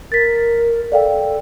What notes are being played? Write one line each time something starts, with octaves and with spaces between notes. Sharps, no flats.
A#4 A6 B6
A4 D5 F5 G5